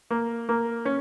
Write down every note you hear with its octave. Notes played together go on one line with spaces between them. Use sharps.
A#3
A#3
C#4